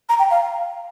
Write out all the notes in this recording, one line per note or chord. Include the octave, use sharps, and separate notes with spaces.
A#5
G5
F5